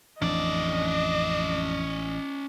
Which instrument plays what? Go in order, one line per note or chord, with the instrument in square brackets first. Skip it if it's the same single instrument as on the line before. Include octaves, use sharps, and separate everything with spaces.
[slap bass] A1 [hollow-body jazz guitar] F2 D4 [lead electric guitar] C#4 D5 [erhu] D#5